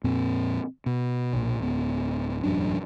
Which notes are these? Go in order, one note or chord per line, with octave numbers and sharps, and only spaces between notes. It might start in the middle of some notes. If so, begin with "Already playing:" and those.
F2 A#2 C4
B2
B1 A#2
D1 B3
E1 A1 F#2 D4